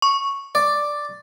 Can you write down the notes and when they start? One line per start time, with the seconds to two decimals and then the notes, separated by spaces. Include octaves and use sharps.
0.02 C#6
0.55 D5